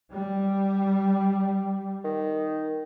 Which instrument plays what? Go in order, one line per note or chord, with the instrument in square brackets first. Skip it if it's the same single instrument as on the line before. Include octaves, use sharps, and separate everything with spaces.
[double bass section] G3
[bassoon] D#3